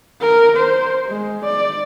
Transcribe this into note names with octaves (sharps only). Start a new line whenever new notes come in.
A#4
C5
G#3
D5